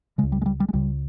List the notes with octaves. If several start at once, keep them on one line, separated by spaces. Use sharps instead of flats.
C#3 G#3
C#2
G3
G#3
G3
G3
G#3
C#2 C#3 G3